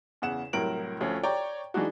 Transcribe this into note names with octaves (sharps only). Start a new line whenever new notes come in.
E2 C#3 F#5 E7
C2 A2 F#3 A#4 D7 F#7
D2 F3 C#4
C#5 D5 G5 A#5
E3 G#3 D4 D#4 F#4